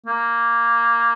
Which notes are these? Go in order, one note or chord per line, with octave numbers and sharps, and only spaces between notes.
A#3